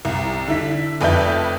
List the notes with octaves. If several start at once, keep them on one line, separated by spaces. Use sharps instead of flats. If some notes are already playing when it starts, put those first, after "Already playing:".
C2
D3 E4 B6
F1 F2 B4 D5 E5 G6